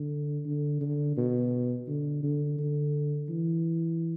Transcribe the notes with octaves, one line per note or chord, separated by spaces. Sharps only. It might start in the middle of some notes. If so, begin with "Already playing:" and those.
Already playing: D3
D3
D3
B2
D3
D3
D3
E3